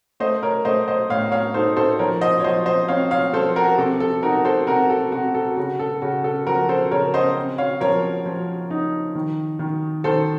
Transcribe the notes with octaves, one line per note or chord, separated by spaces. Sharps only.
A3 C5 D#5
A#4 C#5
A3 C5 D#5
C5 D#5
A2 C#5 F5
C#5 F5
D#4 A4 C5
A4 C5
F3 A#4 C#5
C5 D#5
C#5
F3 C5 D#5
C5 D#5
C4 C#5 F5
C#5 F5
F3 A4 C5
F#4 A#4
C3 A4
A4
D#4 F#4 A#4
A4 C5
C3 F#4 A#4
A4
C3 F#4
A4
C#3 F#4
A4
C#3 F#4
A4
F3 F#4 A#4
A4 C5
C#3 A#4 C#5
C5 D#5
C4
C#5 F5
F3 A#4 C#5
F3
D#4
D#3
D#3
D#3 A4 C5